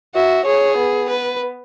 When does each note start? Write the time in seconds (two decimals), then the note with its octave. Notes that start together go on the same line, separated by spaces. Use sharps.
0.15 F#4 E5
0.46 G#4 C#5
0.78 B3
1.09 B4